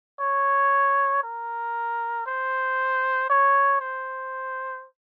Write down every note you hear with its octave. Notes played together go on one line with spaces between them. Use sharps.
C#5
A#4
C5
C#5
C5